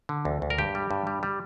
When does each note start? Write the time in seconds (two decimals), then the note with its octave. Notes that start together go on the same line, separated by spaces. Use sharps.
0.09 D3
0.25 D2
0.42 D2
0.50 A#4
0.58 G2 G4
0.75 G3
0.91 G2
1.07 G3
1.23 G3